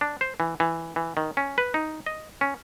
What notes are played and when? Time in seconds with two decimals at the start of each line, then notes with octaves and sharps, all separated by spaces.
0.01 D4
0.21 C5
0.40 E3
0.60 E3
0.96 E3
1.17 D#3
1.37 C#4
1.58 B4
1.74 D#4
2.06 D#5
2.41 C#4